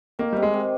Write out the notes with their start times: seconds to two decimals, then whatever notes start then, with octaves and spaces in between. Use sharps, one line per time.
0.19 D#3 A#3
0.33 C3 G3
0.43 G#3
0.54 C3